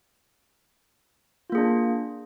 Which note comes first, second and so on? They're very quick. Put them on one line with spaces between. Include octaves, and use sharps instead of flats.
F4 A#3 G#4 D4